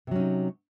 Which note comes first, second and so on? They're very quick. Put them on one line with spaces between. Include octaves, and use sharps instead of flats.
C3 F#3 C#4 D#4